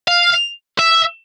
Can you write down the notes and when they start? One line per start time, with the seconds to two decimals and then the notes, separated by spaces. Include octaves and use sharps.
0.08 F5
0.79 E5